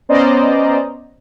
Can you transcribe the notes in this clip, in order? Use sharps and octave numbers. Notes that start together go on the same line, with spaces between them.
B3 C#4 C5 D5 D#5 A#5